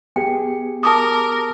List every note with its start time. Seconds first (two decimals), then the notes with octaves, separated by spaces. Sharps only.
0.16 B3 G4 G#4 G5
0.83 A#4 A5 D6 D#6